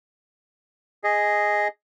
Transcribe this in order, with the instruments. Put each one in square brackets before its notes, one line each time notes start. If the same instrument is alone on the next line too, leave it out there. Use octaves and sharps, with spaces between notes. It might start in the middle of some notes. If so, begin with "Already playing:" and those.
[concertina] G#4 D#5